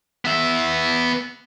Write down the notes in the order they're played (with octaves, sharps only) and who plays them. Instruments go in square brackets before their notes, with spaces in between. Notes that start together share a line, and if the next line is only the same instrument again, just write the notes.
[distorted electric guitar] B3 E5